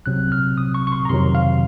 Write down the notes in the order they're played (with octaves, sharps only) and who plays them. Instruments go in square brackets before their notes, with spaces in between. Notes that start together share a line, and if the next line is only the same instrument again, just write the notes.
[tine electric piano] C2 C3 F#3 C4 F#6
F6
D#6
C#6
C#6
C6
A#5
F2 C3 D#3 F#3 C6
F5